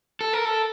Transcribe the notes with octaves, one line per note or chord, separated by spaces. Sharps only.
A4
A#4
A4